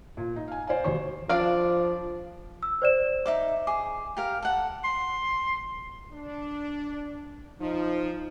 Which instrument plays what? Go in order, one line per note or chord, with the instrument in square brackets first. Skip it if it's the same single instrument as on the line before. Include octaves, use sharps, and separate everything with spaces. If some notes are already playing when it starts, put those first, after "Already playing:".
[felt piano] A#2
D#4
F5 G#5
C5 D5 F5 G#5
E1 D#2 C5 C#6
[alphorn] F3 [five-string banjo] D4 D5 F5
[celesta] E6
C5 D5 E7
[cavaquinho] D#4 E5 D6
[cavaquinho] G#4 [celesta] D6
[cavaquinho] G4 A#4 F5
A4 F#5
[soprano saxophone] C6
[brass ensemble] D4
[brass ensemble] F3 [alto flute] D#4